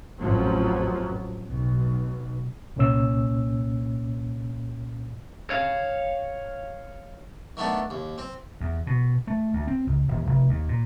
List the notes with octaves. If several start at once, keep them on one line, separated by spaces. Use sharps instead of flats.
A1 F2 F3 F#3
B1
C2 A#2 A#3 C#4 C#5 E6
C#5 F5
D#3 A3 B3 D4
D#2
C4
E2
B2
A3
D2
C4
C#2
D#1
F1
D#2
A#2